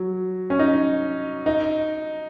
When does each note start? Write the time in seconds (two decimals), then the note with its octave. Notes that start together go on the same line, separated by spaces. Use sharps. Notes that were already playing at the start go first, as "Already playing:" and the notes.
Already playing: F#3
0.50 C#4
0.59 D#4
1.46 D#4